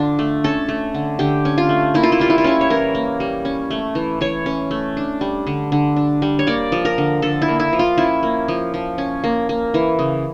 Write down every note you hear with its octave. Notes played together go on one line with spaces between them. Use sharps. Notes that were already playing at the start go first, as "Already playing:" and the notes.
Already playing: D3 D4 F4
A3
C#4 A4
A3
D3
D3 G4
C#4
F4
A3
A#3 E4
F4
E4
G3 F4
E4
F4
C#4 E4
C#5
E3 A#4
A#3
G3
C#4
A3
E3
E3 C#5
C#4
A3
D4
G3
D3
D3
D4
G3
C#5
A#3 D5
F3
A#4
D3
D3 A4
E4
A#3
E4
F3
F4
C#4 E4
A#3
F3
F3
C#4
A#3
A#3
E3
C#3